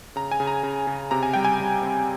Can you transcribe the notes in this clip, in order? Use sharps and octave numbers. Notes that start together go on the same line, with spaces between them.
C#3 A#5
G#5
C#3
A#5
C#3
C#3
C3 A#5
G#5
G3 G5
G#5
G3
C4